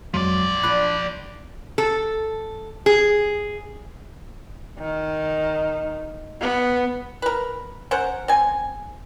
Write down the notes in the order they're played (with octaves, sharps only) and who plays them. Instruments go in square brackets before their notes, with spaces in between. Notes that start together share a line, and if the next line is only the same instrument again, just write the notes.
[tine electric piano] F2 F#3 G#3 [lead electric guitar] F3 D5
[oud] D4 F4 [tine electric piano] B5 D6 F#6
[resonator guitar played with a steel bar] A4
G#4
[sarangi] D#3
B3
[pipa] A#4 B4
C#4 A#4 C5 F#5
C4 G#5